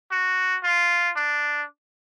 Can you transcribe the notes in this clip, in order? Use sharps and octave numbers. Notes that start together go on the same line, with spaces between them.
F#4
F4
D4